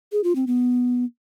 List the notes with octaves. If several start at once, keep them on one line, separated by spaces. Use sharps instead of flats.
G#4
F4
C4
B3